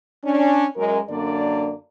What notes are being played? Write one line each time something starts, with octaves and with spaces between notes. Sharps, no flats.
C#4 D4
F#2 G#3 A#4
F#2 D3 A#3 D4 D5